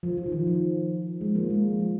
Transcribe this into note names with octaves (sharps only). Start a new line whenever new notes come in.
F3
F3
D#3
F3
F3
G#3
F3 A#3
G#3
F3